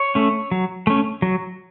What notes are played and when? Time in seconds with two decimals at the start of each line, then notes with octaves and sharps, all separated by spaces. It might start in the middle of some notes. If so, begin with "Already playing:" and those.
Already playing: C#5
0.15 A3 C#4
0.51 F#3
0.87 A3 C#4
1.22 F#3